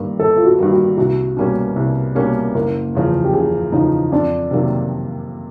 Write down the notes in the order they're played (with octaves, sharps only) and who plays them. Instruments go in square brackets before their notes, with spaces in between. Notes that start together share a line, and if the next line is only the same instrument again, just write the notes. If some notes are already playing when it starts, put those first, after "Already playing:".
Already playing: [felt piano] G1 G2 D#3 G3 A#3
[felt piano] G1 [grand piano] A4
[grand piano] F4
F#4
[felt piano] G2 D#3 G3 A#3
[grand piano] F#4
[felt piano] C2 [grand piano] F#4
[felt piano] B2 G3 A#3 C#4
C2
B2 G3 A#3 C#4
[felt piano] F#1 [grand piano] A#4
[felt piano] E2 C#3 F3
[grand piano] G4
[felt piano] F#1 [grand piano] G#4
[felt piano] E2 C#3 F3 [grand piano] D#4
[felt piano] F2 [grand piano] D4
[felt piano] C3 D#3 F#3 A#3